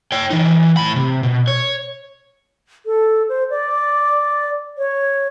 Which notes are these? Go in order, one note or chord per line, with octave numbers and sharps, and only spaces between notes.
C#5 G5
E3 D#4
A2 B5
C3
B2
C#5
A4
C5
D5
C#5